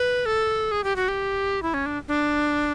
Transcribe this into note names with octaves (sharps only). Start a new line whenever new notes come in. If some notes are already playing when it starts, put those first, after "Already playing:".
Already playing: B4
A4
G#4
G4
F#4
G4
E4
C#4
D4
D4